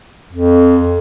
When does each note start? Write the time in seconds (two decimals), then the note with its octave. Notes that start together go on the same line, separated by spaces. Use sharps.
0.33 F2